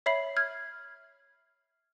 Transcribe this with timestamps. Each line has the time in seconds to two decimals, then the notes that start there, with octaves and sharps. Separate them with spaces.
0.06 C#5 E5 B5 C7 F#7
0.36 F6 G#6